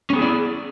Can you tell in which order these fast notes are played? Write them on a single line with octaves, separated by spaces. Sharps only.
C#4 B3 G#4 E4 D5